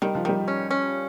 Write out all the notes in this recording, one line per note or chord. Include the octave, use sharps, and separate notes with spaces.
D#3 G3
F3
D#3 G3
C#4
C#4